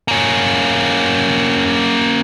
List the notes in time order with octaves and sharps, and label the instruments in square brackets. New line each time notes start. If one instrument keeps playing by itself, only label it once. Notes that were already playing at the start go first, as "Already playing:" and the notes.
[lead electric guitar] A#3 C#4